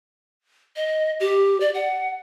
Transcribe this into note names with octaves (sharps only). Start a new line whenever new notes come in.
D#5
G4
D5
F#5